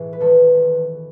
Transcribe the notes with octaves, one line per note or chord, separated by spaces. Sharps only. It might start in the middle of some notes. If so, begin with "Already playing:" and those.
Already playing: B1 A2 E3 G#4
B4
E1 E2 D#3 A4